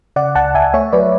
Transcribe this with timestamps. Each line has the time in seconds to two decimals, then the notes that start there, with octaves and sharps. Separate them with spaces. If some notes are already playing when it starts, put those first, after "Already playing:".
0.16 C#3 D5 F#5
0.35 C#2 F#5 A5
0.55 C#2 E5 G#5
0.73 A3 C#5 E5
0.92 F#3 B4 D5